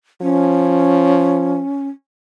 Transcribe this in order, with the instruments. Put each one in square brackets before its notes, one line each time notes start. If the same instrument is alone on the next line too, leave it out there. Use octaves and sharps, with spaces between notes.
[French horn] F3 [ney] C#4